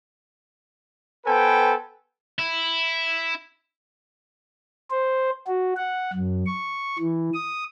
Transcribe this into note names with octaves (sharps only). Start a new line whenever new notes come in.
B3 A4 B4 C5 G5 G#5
E4
C5
F#4
F#5
F#2
C#6
E3
D#6